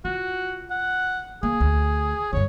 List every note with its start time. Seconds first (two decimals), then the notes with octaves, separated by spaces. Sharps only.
0.05 F4 F#4
0.70 F#5
1.43 A#3 G#4
1.60 D2
2.33 G2 D3 C#5